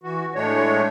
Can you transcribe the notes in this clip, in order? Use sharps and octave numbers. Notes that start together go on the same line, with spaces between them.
E3 F#4
A2 G#3 A3 D4 C#5